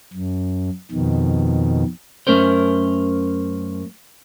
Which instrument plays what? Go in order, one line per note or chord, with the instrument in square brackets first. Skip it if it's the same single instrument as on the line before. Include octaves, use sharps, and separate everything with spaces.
[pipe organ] F#2
F2 B2 D#3
[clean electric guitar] F#2 C#3 A3 C#4 A#4 C5